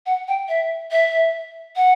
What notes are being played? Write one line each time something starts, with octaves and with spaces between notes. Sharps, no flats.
F#5
G5
E5
E5
F#5